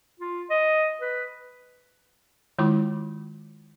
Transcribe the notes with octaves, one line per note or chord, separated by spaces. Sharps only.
F4
D#5
B4
D#3 G#3 E4 F4 B5 D6